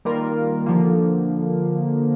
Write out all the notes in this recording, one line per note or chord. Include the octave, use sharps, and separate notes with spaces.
D#3 G3 A#3 F4 A#4
D3 F3 A#3